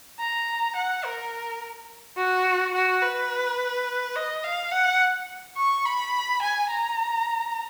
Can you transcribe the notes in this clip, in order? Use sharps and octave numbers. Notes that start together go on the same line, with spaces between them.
A#5
F#5
A#4
F#4
F#4
B4
D#5
F5
F#5
C#6
B5
G#5
A#5